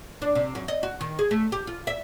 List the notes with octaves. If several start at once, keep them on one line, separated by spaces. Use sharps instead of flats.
D4
C3
F#2
D#5
F#4
D#3
G#4
A3
G4
F4
E5